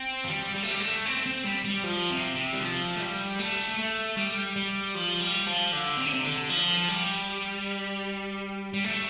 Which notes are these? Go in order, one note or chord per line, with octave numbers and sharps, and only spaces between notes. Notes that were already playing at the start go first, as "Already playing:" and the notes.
Already playing: C4
F3
G3
G3
A3
G3
A3
C4
C4
G3
G3
F3
C3
C3
G3
F3
A3
G3
A3
A3
G3
G3
F3
G3
F3
D3
C3
D3
C3
D3
F3
G3
G3
A3